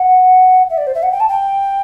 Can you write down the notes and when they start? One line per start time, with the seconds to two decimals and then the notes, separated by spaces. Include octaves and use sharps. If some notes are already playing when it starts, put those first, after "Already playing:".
Already playing: F#5
0.70 E5
0.77 D5
0.87 C5
0.95 E5
1.03 F#5
1.12 G5
1.20 A5
1.29 G5